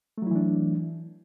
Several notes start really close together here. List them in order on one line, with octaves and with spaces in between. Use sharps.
A3 F#3 E4 E3 D4